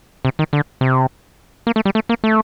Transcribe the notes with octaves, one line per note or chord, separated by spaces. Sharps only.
C3
D#3
D3
C3
A#3
A3
G3
A3
A#3
A3